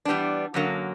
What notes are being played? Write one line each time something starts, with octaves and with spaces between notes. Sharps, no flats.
E3 G3 B3 D4
F#2 D3 F#3 A#3